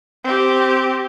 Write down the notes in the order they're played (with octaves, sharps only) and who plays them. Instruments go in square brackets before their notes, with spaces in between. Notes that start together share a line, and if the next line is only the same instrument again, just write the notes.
[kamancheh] C4 G4